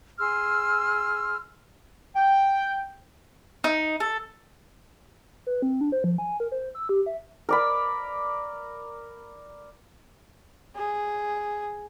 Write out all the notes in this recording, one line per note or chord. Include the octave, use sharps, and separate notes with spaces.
G#4 C6 E6 F6
G5
D#4
A4
B4
C4
D4
C5
F3
G#5
A#4
C5
E6
G4
E5
A#4 D5 B5
G#4